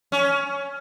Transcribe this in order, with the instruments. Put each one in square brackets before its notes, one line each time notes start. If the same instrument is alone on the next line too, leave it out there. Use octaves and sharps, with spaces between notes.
[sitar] C#4